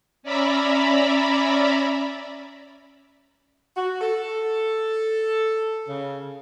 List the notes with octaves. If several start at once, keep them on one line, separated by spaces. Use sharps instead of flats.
C#4 D5 E5 A#5 B5
F#4
A4
C#3